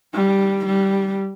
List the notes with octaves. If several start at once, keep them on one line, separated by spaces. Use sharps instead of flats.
G3
G3